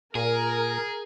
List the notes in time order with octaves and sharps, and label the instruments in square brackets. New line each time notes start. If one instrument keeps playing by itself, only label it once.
[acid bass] A#2 [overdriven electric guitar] G#4 [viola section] A#4